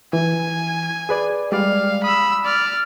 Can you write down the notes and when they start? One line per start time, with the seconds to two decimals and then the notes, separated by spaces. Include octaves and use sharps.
0.13 E3 G#5
1.09 G#4 B4 D5
1.52 G3 G#3 D5 F5
2.04 B5 D#6 E6
2.45 D5 F6